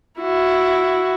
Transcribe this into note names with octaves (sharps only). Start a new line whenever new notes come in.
E4 F#4